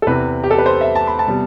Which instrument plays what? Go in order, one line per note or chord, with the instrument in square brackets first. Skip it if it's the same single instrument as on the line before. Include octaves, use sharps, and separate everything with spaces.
[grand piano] A4
E2 C3 E3 B4
G4
A4
B4
C5
E5
A5
B5
A5
C3 G3 B3